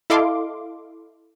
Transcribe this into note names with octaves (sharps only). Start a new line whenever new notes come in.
E4 A4 D#5 F5 C6 D6